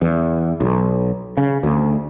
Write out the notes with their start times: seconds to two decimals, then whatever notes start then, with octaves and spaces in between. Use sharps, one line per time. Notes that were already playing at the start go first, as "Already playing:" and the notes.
0.02 E2
0.60 B1
1.37 C#3
1.63 D2